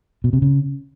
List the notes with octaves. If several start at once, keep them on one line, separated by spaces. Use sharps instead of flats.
B2
C3
C#3